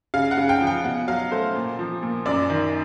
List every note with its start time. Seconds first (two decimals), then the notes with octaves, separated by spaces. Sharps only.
0.14 C#3 F5
0.31 F#5
0.37 C#3
0.49 G5
0.61 F3
0.67 G5
0.84 B2 F#5
1.08 F#3 F5
1.32 A3 C5
1.55 A#2
1.79 F3
2.03 A#2
2.26 F#2 D5
2.50 D#3